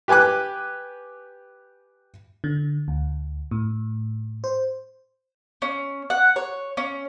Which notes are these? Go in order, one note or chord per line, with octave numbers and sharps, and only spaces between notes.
G4 B4 G#5 D6 F#6
D3
D2
A2
C5
C#4
F#5
C#5
C#4